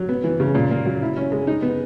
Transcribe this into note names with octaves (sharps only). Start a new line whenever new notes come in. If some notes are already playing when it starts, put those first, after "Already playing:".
Already playing: F#3
B3
E3
C#3
A#2
A#3
F#3
E4
C#4
G#3
D#4
B3